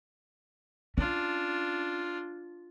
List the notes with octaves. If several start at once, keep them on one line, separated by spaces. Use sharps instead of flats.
C#4 D4 F4